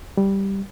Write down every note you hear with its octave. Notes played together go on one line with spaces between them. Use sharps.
G3